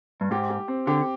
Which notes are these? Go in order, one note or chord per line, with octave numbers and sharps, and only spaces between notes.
G2
G#2 G4
G4
C4
D3 G4